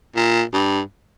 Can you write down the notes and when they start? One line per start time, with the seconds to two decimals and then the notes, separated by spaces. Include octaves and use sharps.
0.16 A#2
0.54 G2